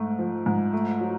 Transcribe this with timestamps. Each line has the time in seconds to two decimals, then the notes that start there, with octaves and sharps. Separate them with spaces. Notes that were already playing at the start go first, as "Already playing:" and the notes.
Already playing: G#2 A3
0.19 F3
0.46 G#2
0.73 A3
1.01 F#3